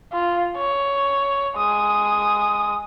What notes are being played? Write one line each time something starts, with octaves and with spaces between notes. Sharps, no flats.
F4
C#5
G#3 D#6